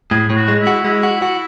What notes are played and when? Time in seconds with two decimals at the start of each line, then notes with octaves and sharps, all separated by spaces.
0.11 A2 G#4
0.30 A2
0.36 F#4
0.48 G#3
0.61 E4
0.67 F#4
0.84 G#3 E4
1.03 F#4
1.22 F#4